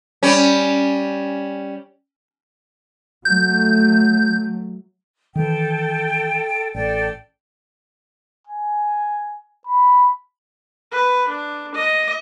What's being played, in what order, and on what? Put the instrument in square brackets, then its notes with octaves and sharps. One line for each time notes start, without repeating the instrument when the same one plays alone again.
[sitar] G3 C#4
[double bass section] F#3 A3 [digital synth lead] G6
[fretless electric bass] D#3 E3 [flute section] A4 G5
[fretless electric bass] A1 [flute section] A4 D5 G5
[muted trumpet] G#5
B5
[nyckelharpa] B4
D4
D#5